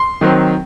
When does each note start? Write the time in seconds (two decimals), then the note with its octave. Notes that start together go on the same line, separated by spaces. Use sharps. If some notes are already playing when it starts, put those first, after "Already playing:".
Already playing: C6
0.21 D#3 F#3 C4